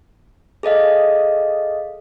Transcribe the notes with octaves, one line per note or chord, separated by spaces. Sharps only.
G#4 A4 D#5 F5